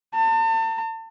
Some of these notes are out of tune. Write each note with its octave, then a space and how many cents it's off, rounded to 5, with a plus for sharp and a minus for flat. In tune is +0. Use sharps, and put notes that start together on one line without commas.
A5 +40